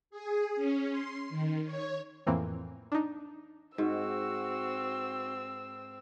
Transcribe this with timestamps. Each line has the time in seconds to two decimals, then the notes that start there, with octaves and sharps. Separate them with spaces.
0.10 G#4
0.55 C#4
0.90 C6
1.30 D#3
1.65 C#5
2.27 F2 A2 E3 A#3 C4
2.92 D4 D#4
3.78 G#2 C4 F#4 E6